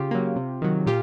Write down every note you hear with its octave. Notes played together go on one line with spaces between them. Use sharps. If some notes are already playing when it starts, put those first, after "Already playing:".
Already playing: C#3 F4 G4
F#3 A#3
C3
D#3 F#3
A#2 F4 G4